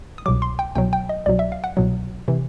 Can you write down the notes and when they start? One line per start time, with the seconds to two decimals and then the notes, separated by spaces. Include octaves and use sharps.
0.18 D#6
0.26 C2 B2 F#3 D6
0.42 C6
0.59 G5
0.75 C2 B2 F#3 G5
0.93 G5
1.09 D#5
1.26 C2 B2 F#3 D5
1.39 E5
1.52 F5
1.64 F#5
1.77 C2 B2 F#3
2.28 C3 E3